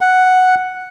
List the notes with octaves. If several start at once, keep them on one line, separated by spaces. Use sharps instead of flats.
F#5